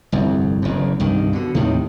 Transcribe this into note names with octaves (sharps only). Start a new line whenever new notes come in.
G1 C2 F2
F#1 E2
C2 G2 D#3
B2 D3
D#2 A2 C3 D#3